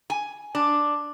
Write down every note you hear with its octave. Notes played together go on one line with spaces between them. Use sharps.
G#5
D4